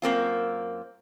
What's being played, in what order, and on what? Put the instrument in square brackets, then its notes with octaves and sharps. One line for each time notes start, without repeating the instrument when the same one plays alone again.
[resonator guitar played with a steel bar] F#2 A#3 C4 F4